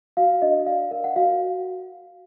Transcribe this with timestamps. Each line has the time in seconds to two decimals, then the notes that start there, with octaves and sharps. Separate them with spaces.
0.17 F#4 F5
0.42 D4 D#5
0.67 D5 F5
0.91 A#4 F5
1.04 F#5
1.16 F#4 F5